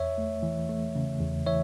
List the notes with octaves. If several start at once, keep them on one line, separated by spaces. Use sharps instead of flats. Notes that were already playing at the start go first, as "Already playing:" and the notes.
Already playing: E2 C#5 E5
A3
E3
A3
C#3
E2
E3 C#5 E5